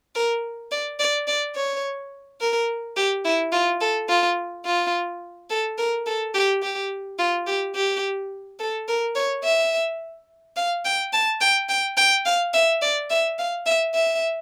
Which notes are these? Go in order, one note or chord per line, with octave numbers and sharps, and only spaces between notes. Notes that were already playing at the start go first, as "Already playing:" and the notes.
A#4
D5
D5
D5
C#5
A#4
G4
E4
F4
A4
F4
F4
A4
A#4
A4
G4
G4
F4
G4
G4
A4
A#4
C#5
E5
F5
G5
A5
G5
G5
G5
F5
E5
D5
E5
F5
E5
E5